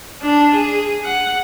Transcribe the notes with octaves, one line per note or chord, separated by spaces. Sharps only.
D4
G#4
F#5